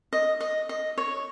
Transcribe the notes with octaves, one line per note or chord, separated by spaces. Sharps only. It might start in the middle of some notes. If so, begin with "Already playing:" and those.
D#5
D#5
D#5
C#5